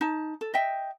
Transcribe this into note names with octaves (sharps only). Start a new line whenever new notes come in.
D#4 A5
A4
D#5 E5 G5